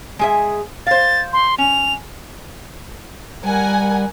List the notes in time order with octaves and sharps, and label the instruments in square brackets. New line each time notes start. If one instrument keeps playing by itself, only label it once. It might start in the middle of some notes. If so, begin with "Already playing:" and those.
[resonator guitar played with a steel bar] G#3 G#4 E5
[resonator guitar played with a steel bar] C5 F5 [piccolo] A6
[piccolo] C6
[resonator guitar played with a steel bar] C#4 [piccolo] F7
[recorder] G3 [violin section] A#4 F#5 G#5